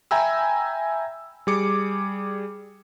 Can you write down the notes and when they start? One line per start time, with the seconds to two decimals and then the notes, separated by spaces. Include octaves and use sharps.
0.11 E5 G5 G#5 A#5 B5 E6
1.47 G3 G#4 D6 C#7